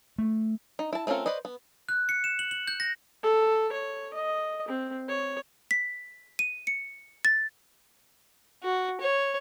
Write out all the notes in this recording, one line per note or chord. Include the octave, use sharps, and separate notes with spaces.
A3
D#4
E4 A5
A3 C4 C#4 F4 A#4
B4 C5 D5 D#5
B3
F#6
C#7
E7
F#7
F#7
G6
A#6
A4
C#5
D#5
C4
C#5
B6
D#7
C#7
A6
F#4
C#5